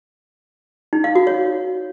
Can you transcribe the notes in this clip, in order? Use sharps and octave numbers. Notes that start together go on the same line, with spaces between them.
D#4
F5
F#4
C#5